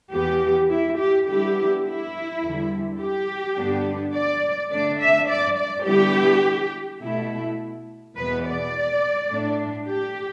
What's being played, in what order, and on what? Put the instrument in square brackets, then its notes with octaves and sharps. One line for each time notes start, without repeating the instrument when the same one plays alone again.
[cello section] E2 E3 B3 G4
E4
G4
D3 G3 B3 E4 G4
E4
E2 D3 G3
G4
G2 D3 B3 D4
D5
D3 A3 D4 D5
E5
D5
D5
D3 G3 B3 E4 G4
B2 A3 E4
E2 B2 B3 B4
D5
A2 A3 D4
G4